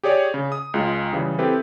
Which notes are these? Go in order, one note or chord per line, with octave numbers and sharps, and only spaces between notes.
G4 G#4 C#5 D5
C#3
D#6
C#2 G#3 F4
C#3 E3 G3
C4 E4 G4 A4 B4